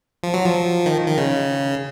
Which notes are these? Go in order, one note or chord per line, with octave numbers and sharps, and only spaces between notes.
F3
F#3
F3
D#3
D#3
C#3